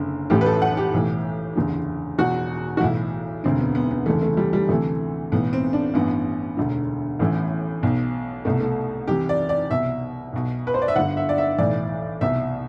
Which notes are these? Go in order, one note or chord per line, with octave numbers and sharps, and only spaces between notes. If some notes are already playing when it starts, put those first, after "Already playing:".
Already playing: F#1 F#2 D3
A1 A2 E3 G4
B4
A4
F#5
G4
B1 A2 E3
F#1 E2 D3
E1 E2 B2 F#4
F#4
B1 A2 E3 E4
E1 D2 D3 C4
B3
B3
B3
F#1 E2 C3 E3 A3
A3
G3
G3
D2 C3 E3 A3
B1 A2 E3 B3
C4
D4
A1 G2 E3 B3
E1 D2 D3
A1 A2 E3
B1 B2
C2 B2 A3
A3
C2 C3 E3 G4
D5
D5
C2 B2 E5
B1 B2
B4
C5
D5
E5
G1 G2 D3 F#5
E5
D5
E5
B1 A2 E3 D5
C2 B2 E5